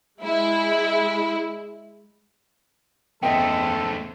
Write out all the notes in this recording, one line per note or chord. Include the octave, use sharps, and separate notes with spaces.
G#3 E4
E2 G#2 A3 C4 C#4 A4 D#5 G5